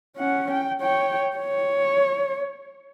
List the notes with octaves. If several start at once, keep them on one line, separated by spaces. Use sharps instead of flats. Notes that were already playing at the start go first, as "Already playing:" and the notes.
C#4 F#5
G5
C#5 G5
C#5